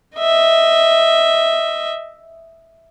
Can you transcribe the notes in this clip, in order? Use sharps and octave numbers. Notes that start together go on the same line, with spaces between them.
D#5 E5